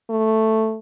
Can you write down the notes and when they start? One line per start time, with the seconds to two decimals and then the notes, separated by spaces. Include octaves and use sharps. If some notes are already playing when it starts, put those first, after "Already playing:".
0.10 A3